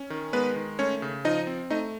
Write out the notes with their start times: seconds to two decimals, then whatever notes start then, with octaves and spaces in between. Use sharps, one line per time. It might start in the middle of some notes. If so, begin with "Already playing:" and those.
Already playing: C#4
0.10 D#3
0.33 G#3 B3 B4
0.56 D#3
0.79 A3 C#4 C#5
1.02 C#3
1.25 F3 D#4 D#5
1.47 C4
1.70 A3 D#4 D#5